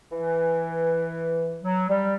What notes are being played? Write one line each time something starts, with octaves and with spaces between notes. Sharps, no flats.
E3
F#3
G3